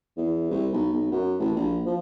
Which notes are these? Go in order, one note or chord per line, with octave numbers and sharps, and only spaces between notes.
E2
C2
B1
B1
F#2
A1
A#1
F3